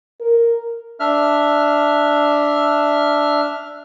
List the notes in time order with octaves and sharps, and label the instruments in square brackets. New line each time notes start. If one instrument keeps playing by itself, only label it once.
[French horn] A#4
[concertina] D4 E5 F6